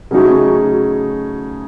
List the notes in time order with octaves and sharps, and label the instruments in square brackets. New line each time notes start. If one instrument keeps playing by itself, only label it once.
[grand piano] C#3 F#3 A3 D#4 G#4 [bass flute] F#4